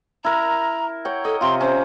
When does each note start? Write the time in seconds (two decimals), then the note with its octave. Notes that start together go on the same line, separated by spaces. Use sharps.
0.24 E4 A#4 A#5
1.05 C#5 F#5 G5
1.25 A4 D#5
1.41 C3 F4 C6
1.61 C#4 C5